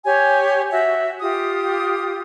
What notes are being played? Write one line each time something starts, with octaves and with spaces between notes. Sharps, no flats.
G4 C#5 G#5
F#4 E5
F4 G4 D#6